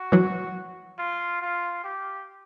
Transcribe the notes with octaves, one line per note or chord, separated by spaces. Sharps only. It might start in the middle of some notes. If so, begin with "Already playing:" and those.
Already playing: F#4
E3 F#3
F4
F4
G4